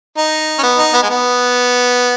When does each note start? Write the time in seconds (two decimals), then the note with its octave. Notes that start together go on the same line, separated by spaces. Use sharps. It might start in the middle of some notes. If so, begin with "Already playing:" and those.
0.17 D#4
0.58 C#4
0.63 B3
0.78 D#4
0.94 B3
1.03 G#3
1.09 B3